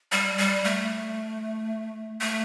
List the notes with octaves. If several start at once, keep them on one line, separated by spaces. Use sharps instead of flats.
G3
G3
A3
A3